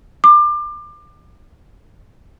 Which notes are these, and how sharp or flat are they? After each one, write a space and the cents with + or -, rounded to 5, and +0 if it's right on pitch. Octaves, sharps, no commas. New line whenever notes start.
D6 +30